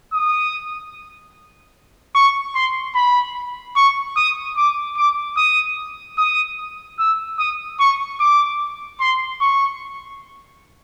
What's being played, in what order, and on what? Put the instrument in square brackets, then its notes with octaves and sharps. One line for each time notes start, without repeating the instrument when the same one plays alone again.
[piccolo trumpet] D#6
C#6
C6
B5
C#6
D#6
D6
D6
D#6
D#6
E6
D#6
C#6
D6
C6
C#6